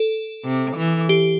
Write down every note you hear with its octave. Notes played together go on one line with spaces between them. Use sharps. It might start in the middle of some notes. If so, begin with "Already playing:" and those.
Already playing: A4
C3
E3
G4